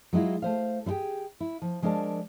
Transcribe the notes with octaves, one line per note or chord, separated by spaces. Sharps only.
F#3 G#3 E4 F4
A3 C5 F5
G3 E4 G4 G#4 G5
E4
F3
F3 G#3 D4 A#4 D5 A5